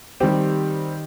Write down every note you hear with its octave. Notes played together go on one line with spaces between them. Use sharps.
D#3 G3 C4 G4